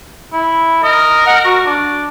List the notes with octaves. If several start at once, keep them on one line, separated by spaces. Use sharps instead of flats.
E4
A#4 D#5
F#5
F#4
D4